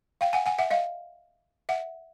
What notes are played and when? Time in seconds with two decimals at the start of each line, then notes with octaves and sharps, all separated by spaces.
0.21 F5 G5
0.33 F#5 G#5
0.46 F#5 G#5
0.59 E5 F#5
0.71 D#5 F5
1.69 E5 F#5